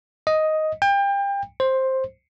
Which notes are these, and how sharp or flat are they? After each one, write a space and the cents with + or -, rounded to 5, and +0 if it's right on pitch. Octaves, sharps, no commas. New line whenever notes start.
D#5 +5
G5 +30
C5 +10